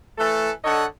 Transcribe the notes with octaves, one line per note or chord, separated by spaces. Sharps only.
E3 A3 A4
D3 A4 C#5 D#5 F#5